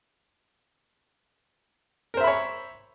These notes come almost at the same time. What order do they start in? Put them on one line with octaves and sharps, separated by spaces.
A#4 C5 E5 B5 C#5